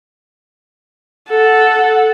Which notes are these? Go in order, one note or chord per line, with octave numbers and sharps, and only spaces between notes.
A4 F#5